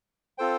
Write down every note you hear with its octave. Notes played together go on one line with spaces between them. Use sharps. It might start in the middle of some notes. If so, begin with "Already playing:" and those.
C4 F4 A4 C5 G5